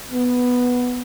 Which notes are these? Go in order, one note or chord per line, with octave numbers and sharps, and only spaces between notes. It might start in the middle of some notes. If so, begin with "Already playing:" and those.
B3